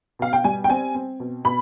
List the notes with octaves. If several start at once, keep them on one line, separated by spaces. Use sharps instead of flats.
B2 F5
G5
G3 G#5
G5
C4 G#5
C4
B2
B2 B5